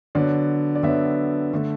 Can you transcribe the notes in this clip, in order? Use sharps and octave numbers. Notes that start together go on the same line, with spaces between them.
D3 F#3 B3 D5
D5
D3 F#3 B3 E5
D3 A3